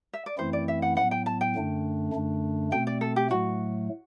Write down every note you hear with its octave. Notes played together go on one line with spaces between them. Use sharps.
E5
D5
F#2 E3 A3 C4 E4 C5
D5
E5
F#5
A2 F#3 B3 F#5
G5
A5
G5
F#2 D3 A3 D4
F#2 D3 A3 D4
B2 A3 C4 G5
D5
A4
G4
A2 F#3 A3 F#4